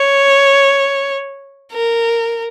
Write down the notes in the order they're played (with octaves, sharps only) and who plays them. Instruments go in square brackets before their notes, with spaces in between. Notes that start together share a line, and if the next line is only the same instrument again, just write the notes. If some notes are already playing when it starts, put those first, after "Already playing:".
Already playing: [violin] C#5
A#4